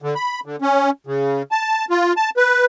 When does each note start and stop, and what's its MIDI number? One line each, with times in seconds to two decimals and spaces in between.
0.02 0.14 50
0.15 0.40 83
0.46 0.56 50
0.62 0.90 61
1.07 1.42 49
1.51 1.85 81
1.90 2.13 65
2.17 2.30 81
2.37 2.65 71